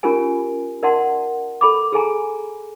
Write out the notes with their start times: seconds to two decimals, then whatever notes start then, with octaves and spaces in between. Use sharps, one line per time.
0.03 C#4 F4 G4 A#4 G#5
0.83 A#4 D5 E5 F#5 A5 C6
1.61 A4 B5 D6
1.93 G#4 A4 G#5 A#5